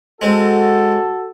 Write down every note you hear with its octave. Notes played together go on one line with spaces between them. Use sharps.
G#3 C4 F#4 A4